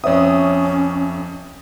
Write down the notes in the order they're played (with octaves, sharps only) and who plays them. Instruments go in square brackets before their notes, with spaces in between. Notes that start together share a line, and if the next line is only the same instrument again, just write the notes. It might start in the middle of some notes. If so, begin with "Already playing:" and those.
[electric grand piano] F2 D#6 [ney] C#4 [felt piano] C#5 E5